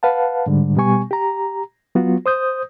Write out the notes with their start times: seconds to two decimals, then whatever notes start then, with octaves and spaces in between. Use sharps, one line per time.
0.03 B4 F5 F#5 A5
0.46 G#2 D3 G3
0.76 B2 G3 B3 G4 G#5 C#6
1.11 G4 A#5
1.95 F#3 B3 F4 F#4
2.26 C5 D#6 G6